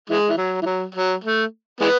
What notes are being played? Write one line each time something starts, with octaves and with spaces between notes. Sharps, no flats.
E3 G#3
E3
F#3
E3
F#3
F#3
A3
E3 G#3 B3